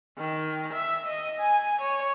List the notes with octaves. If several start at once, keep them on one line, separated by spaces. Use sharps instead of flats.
D#3
E5
D#5
G#5
C#5